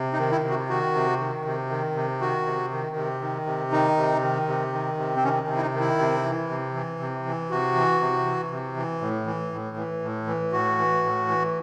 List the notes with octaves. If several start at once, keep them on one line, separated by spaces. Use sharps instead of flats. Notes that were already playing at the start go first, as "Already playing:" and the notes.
Already playing: C3
D#4
D#3
E4
C3
F#4
D#3 F#4
C3
D#3
C3
D#3
C3
D#3 F#4
C3
D#3
C3
D#3
C3
D#3 D#4
C3
D#3
C3
D#3
C3
C4
D#3 C#4
C3
E4
D#4
D#3
E4
C3
E3
C3
E3
C3
E3
C3 F#4
E3
C3
E3
C3
E3
A2
E3
A2
E3
A2
E3
A2 F#4
E3
A2
E3